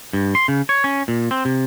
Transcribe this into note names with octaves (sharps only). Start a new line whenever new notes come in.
G2
C6
C#3
C#5
C#4
A#2
C4
C3